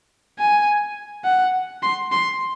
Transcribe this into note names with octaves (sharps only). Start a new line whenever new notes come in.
G#5
F#5
C6
C6